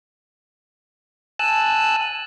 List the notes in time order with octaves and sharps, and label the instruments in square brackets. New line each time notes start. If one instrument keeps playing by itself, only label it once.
[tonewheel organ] G#5 A5 E6 F#6